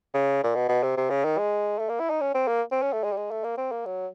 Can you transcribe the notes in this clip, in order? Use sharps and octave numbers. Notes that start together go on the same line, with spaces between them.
C#3
A#2
B2
B2
C3
C3
C#3
D#3
G#3
A3
A#3
E4
D#4
C#4
C4
A#3
C4
C#4
A3
G#3
G3
G#3
A3
A#3
C4
A#3
F#3